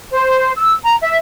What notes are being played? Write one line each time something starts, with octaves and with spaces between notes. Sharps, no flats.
C5
E6
A#5
E5